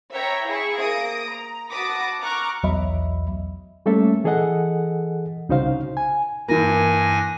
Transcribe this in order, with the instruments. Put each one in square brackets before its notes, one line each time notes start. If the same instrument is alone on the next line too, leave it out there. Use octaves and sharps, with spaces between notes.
[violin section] C#5 E5 G5 A#5 B5
E4 G#4 E5 C#6
A#3 D#6 A#6 D7
A#5
F#4 A5 B5 D6 D#6 A#6
A#5 C#6 D6 F6 F#6
[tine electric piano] B1 E2 F#3 D#5 E5 B5
[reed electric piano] G3 A3 A#3 C#4 A4 E5
E3 G#4 A4 D#5 F#5
C2 C#3 D#4 F#4 C5 F5
G#5
[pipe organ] G2 G#5 A#6 [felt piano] E3 A#3